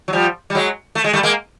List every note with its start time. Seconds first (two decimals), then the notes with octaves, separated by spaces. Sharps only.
0.08 F#3
0.13 F3 G3
0.50 G3
0.55 F#3 G#3
0.95 A3
1.04 G#3
1.13 G3 A3
1.23 G#3 A#3